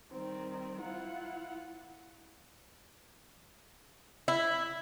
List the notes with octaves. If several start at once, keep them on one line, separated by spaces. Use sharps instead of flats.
D#3 G3 C4
E4 F4 F#5
E4